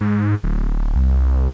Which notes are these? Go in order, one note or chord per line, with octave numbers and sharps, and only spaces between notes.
G#2
D1
D1
C2